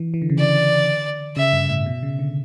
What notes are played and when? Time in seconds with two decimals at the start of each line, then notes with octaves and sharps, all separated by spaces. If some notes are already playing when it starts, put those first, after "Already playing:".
Already playing: E3
0.14 E3
0.22 D3
0.30 C#3
0.37 D3 D5
1.36 C#3 E5
1.53 G2
1.69 A2
1.86 B2
2.03 C#3
2.19 D3